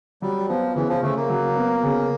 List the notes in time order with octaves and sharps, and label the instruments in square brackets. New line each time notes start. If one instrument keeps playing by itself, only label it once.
[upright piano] F#3 [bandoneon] G3
[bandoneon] F3 [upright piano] B3
[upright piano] C#3 [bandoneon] E3
[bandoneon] F3
[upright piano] C#3 [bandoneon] A3
[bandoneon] A#3
[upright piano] F#3
B3
C#3